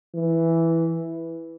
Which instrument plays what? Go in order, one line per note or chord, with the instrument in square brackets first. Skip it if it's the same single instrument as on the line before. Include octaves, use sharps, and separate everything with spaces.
[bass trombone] E3